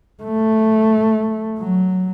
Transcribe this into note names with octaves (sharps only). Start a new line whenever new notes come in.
A3
F#3